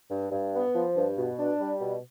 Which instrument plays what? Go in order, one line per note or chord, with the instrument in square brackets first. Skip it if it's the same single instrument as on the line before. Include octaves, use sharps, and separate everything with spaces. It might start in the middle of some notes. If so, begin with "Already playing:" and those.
[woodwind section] G2
G2
B3
F3
G2
B2
D4
G3
B2